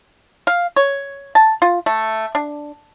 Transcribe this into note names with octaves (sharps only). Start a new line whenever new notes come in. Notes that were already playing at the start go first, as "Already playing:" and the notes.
F5
C#5
A5
F4
A3
D4